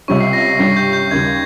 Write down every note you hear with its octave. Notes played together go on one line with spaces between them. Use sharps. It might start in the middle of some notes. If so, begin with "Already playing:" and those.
C#2 C3 G3 C#4 C#6
C7
A#6
C7
G2 G3 C#4 G4 C7
G6
G6
D#2 C#3 G3 G#6